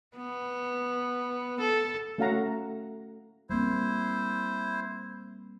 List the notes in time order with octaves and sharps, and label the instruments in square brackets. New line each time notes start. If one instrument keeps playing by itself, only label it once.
[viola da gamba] B3
A4
[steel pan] A3 C#4 F#4 F5 F#5 A#5
[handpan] G3 A#3 C4 [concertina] E4 C5